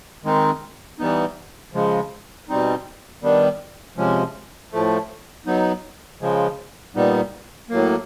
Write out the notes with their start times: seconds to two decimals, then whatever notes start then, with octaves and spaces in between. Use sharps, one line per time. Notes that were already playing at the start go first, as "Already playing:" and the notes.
0.24 D#3 G#3 C4 D#4
0.99 E3 G3 B3 D#4
1.74 C#3 F3 G#3
2.49 B2 G3 C4 D#4
3.23 D#3 G3 B3 D4
3.97 C3 F3 G#3 C#4
4.72 A2 F3 A3
5.46 F#3 B3 D#4
6.21 C#3 F3 G#3
6.96 A#2 G3 B3 D#4
7.70 A2 F#3 A#3